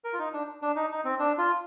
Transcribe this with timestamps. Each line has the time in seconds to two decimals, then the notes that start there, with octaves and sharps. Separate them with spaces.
0.04 A#4
0.13 F4
0.19 D#4
0.33 D4
0.62 D4
0.76 D#4
0.91 D#4
1.05 C4
1.19 D4
1.38 F4